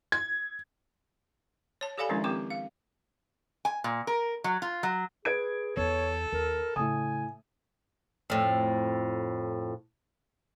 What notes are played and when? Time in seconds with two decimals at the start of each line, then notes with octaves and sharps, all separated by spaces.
0.12 G#6
1.81 C#5 A5
1.98 G4 A4 D5 F5 G#5 B5
2.09 D#3 F3 G#3 C#4 D4 E4
2.24 D#3 C4 G4 C#6 D6
2.50 F5
3.65 G#5
3.84 A#2
4.07 A#4
4.44 F#3
4.62 F4
4.83 F#3
5.25 G#4 B4 G#6 D7
5.77 E2 E4 A4 C#5
6.32 D#2 A#4
6.76 A2 C#3 G#5 D#6
8.30 F2 A2